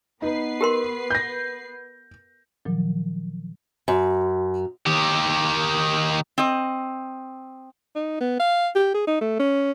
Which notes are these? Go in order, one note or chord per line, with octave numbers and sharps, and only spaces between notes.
B3 D#4 B4 C7
G4 A#4 C6
G6 A#6
A#2 D#3 F3 F#3
F#2
D#3 G4
C4 D#5
D#4
B3
F5
G4
G#4
D#4
A3
C#4